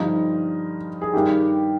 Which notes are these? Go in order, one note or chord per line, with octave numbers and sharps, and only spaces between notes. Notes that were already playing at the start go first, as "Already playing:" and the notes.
Already playing: G2 D3 F3 D#4
G#4
G2 D#3 G4